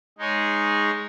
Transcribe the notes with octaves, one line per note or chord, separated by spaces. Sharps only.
G#3 D#4 G#4 C#5